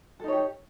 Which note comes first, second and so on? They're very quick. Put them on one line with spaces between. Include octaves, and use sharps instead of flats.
A4 D#4 C#5 G4